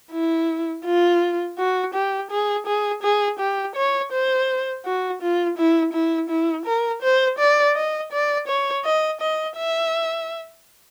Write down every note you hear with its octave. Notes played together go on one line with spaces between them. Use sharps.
E4
F4
F#4
G4
G#4
G#4
G#4
G4
C#5
C5
F#4
F4
E4
E4
E4
A#4
C5
D5
D#5
D5
C#5
D#5
D#5
E5